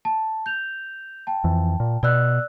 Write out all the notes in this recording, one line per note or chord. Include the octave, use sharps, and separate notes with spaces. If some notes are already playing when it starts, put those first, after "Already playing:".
A5
G6 F7
G5 A5
F2 E3
A#2
B2 D5 E6 F#6